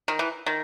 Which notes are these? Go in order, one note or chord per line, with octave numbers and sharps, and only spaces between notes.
D#3
E3
D#3